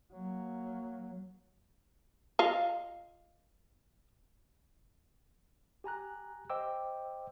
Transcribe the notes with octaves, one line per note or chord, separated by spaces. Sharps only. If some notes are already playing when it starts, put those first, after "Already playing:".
F#3 A#3
F4 D#5 F5
G4 G#5 A#5 F#6
C5 D#5 G5 D6 E6